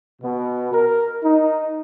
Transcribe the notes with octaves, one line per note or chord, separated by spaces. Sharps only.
B2
A#4
D#4